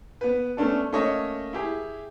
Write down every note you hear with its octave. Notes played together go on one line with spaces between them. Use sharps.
B3 B4
A3 B3 C#4 D4 A4
A3 A#3 C#4 C#5 D#5
E4 G4 G#4